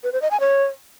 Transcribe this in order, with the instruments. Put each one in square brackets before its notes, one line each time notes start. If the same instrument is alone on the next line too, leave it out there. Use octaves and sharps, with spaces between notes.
[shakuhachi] B4
C5
D#5
G#5
C#5